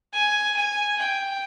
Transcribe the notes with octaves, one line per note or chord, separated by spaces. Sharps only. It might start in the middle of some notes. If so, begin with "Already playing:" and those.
G#5
G#5
G5